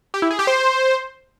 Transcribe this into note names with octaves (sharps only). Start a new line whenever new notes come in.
G4
E4
G#4
G4
C5